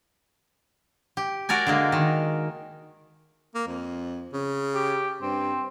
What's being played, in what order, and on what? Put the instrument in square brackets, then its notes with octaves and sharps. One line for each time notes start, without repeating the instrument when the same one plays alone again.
[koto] G4
F#4 A#4 D5 G#5
D3 G#3 A#3
D#3
[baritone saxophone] A#3
F2
C#3
[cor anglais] G4
[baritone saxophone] G2 [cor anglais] C4